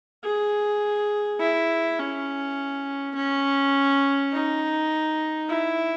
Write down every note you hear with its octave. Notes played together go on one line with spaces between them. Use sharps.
G#4
E4
C#4
C#4
D#4
E4